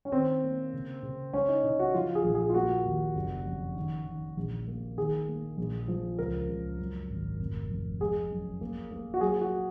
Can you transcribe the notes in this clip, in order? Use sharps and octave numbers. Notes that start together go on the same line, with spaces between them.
C#4
D#3 C4
A#3
C#3
C#3
G#3 C#4
D#4
C#3 D#4
F#4
F3 F4
G#4
A#1
G#4
F4
A#3 F#4
D#2
F#1
F2
D#3
D#3
A#1
A#3
D#3 G#4
A#3
A#1
F3
C#2 A#4
C#2
F#2
G#1
F1
F2
G#3 G#4
F#2
A#3
A#3
F#4
F#3 G#4
F#4